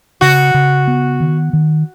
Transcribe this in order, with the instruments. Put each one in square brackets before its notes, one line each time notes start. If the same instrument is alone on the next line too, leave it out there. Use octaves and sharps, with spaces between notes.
[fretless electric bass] C#3 [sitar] F#4
[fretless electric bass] C#3
B3
D#3
D#3